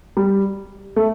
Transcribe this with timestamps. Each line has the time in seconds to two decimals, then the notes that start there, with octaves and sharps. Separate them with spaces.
0.17 G3
0.96 A3